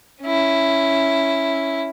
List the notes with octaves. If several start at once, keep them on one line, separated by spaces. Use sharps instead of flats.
C#4 E4